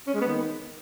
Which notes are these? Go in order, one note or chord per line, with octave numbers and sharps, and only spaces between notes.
C#4
G#3
B3
D#3